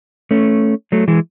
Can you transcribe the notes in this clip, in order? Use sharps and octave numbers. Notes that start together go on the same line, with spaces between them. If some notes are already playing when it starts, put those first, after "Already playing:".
A3 C#4
F#3 A3
E3 G#3